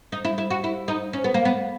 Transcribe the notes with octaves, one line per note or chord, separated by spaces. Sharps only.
D#4
E4
E4
F#4
E4
D#4
C#4
B3
A#3
B3